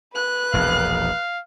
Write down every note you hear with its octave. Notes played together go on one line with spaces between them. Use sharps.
B4 F#6
E1 A#1 E2 F5